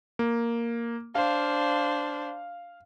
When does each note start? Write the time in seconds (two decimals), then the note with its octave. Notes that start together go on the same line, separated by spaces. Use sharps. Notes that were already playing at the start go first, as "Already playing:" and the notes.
0.19 A#3
1.15 D4 C5 F5